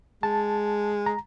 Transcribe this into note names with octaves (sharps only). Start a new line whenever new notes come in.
G#3 A5
A#5